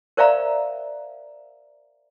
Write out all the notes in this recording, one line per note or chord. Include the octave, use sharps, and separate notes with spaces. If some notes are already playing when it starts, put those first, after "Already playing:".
A#4 C5 D5 E5 F5 A#5